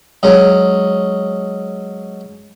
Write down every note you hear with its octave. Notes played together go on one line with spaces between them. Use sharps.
F#3 G#3 C#4